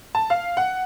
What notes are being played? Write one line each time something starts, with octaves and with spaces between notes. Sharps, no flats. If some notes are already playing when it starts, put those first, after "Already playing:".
A5
F5
F#5